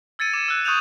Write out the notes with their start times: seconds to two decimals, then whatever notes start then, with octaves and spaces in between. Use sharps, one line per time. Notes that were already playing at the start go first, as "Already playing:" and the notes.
0.19 E6 G#6 A6 C#7 D#7
0.33 D6 E7
0.48 E6 F#6 G#6
0.65 C#6 D#6 F#6 G6 D#7 F7